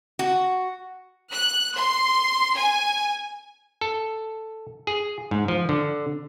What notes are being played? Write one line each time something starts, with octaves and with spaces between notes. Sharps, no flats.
F#4
F#6
C6
G#5
A4
G#4
G#2
F3
D3